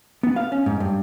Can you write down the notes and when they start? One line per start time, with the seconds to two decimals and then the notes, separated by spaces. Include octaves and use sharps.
0.23 B3
0.36 F5
0.52 C#4
0.66 G#2
0.80 G2